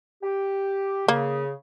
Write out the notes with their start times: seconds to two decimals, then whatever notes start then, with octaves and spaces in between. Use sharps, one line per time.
0.23 G4
1.08 C#3 A#3